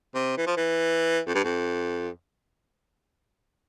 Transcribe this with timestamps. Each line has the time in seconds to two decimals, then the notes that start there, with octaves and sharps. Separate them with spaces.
0.15 C3
0.37 E3
0.47 F3
0.57 E3
1.27 F2
1.35 G2
1.44 F2